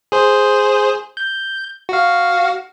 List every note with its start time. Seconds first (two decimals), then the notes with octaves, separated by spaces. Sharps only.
0.12 G#4 C5
1.17 G6
1.89 F#4 F5